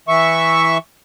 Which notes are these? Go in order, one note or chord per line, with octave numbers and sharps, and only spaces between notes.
E3 E5 C#6